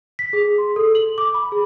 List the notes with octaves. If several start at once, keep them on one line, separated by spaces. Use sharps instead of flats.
B6
G#4
C6
A4
F#7
D6
B5
G#4